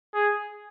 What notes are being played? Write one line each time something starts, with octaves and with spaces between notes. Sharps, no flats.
G#4